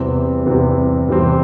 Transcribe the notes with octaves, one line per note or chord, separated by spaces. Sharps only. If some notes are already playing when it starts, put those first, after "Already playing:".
Already playing: E2 C3 E3 G3 C4
E2 C3 E3 G3 C4
E2 C3 E3 G3 C4